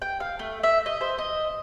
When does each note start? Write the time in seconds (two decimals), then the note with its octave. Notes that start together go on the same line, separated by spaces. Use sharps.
0.02 G5
0.20 F5
0.39 A3
0.63 E5
0.86 D#5
1.01 C5
1.18 D#5